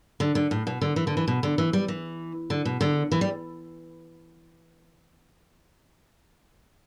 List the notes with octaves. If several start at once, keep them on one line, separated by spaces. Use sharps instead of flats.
D3
D3
A2
B2
D3
E3
D3
E3
B2
D3
E3
G3
E3
D3
B2
D3
E3
G3